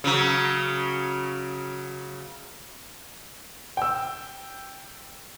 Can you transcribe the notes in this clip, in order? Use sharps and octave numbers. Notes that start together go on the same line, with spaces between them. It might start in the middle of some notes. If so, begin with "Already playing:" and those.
C#3 F#3
G5 E6